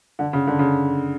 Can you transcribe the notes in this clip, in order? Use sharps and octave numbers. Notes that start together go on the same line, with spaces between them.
D3
C#3
D3
C#3